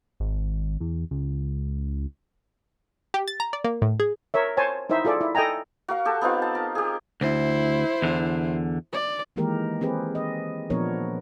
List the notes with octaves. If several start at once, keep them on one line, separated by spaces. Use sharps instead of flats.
G#1
E2
C#2
G4
A6
A#5
D5
A#3
A2
G#4
A#4 C#5 E5
C5 C#5 G#5 A5
D#4 E4 C5 E5
F4 G#4 A4 D5
E4
A4 D#5 G5 G#5 A#5
F#4 A#4 F5
G4 A4 A5
B3 C4 D#4 F4
A5
A#4
G4 G#4
D2 E4 C5
E2 D3
D5
D#3 E3 G#3 A#3 G4 A#4
C4 G4 G#4 B4
D#5
A#2 F3 B3 D4 A#4 C#5